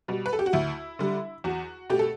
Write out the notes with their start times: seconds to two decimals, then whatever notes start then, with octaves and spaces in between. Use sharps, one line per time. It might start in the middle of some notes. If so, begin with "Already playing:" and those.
0.08 B2 G3
0.26 B4
0.33 A4
0.39 G4
0.46 F#4
0.53 D2 E4
0.99 D3 G3
1.44 E2 F#4
1.90 B2 A3 G4
1.99 A4